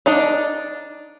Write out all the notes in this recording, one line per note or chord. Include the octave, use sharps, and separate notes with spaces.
D4 D#4 D5